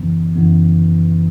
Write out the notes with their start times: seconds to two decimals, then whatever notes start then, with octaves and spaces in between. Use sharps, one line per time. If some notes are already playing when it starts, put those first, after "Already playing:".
Already playing: F#2 C#3 E3 B3
0.36 F#2 C#3 E3 B3